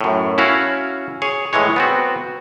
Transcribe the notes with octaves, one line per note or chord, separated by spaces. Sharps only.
F#2 A2
C#4 E4 F#4 F5
G#4 C#5
A2 E3 G#3 C#5
B3 C4 F#4